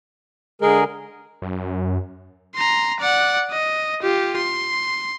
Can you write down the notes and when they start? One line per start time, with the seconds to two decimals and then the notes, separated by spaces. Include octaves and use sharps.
0.62 D3 G#3 G#4 A#4
1.42 F#2
2.55 A#5 C6
3.00 D5 F#5
3.51 D#5
4.02 F4 G4
4.37 C6